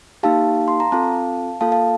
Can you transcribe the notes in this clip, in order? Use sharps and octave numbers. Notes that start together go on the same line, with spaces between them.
A#3 D#4 G4 F5 A5
C6
A#5
C4 F4 A4 F5 A5
A#3 F4 A4 F5 A5
F5 A5